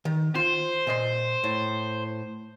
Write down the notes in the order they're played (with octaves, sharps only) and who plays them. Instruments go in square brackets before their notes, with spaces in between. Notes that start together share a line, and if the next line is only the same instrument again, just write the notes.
[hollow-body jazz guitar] D#3
[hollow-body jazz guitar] F4 [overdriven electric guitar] C5
[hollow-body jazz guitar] A#2 D#5 C6
A2